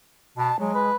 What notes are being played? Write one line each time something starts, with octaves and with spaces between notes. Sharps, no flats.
B2 A5
F#3 G#3
B4